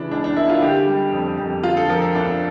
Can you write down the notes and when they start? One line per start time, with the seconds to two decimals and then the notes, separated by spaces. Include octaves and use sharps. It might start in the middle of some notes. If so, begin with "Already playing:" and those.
Already playing: C#3 E3 D4
0.11 C#2 D4
0.24 D4
0.36 A#3 E4
0.49 F4
0.62 D3 G4
0.87 G3
1.12 F2
1.38 F2
1.63 D3 F4
1.77 A4
1.89 F3 A#4
2.02 A4
2.15 D2 D4